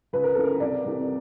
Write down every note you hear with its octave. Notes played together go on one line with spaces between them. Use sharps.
C#2 B4
A#4
C#3 E3 A4
A#4
C2 D5
C3 E3